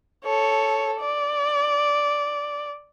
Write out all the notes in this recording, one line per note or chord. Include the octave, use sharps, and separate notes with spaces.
A4 C#5
D5